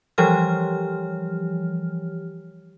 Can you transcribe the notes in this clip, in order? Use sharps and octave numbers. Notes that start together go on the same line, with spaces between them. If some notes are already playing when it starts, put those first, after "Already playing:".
E3 F3 G3 G4 C#5 F6